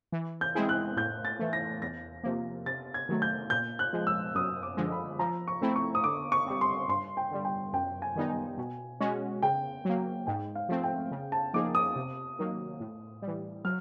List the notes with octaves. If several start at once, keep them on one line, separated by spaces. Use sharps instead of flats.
E3
G6
G#3 C4 E4 G#4
F#6
A2 G6
A6
E3 A3
A#6
E2 A#6
C3 F3 A#3
C3 A6
G#6
D#3 F#3 A3
G6
A#2 G6
F#6
F3 G#3
E6
F#2 D#6
D6
D3 F3 G#3
B5
F3 A#5
C#6
A3 C4 E4
C#6
D#6
D3 D6
C#6
G3 C4
C6
G2 C6
G5
D3 G3
G5
F#2 G5
G#5
D#3 G3 B3 D#4
G#5
B2
G#3 C#4 F#4
C#3 G5
F#3 A#3
G#2 G5
F5
F3 A3 C4
G5
C#3
A5
F3 A#3 D#4 G#4 D6
D#6
C3
D#3 F#3 A#3
A2
G3
E3
F#3 F6